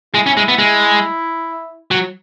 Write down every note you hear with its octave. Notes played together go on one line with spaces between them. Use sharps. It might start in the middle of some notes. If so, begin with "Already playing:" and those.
G#3 E4
C#4
G#3
B3
G#3
F#3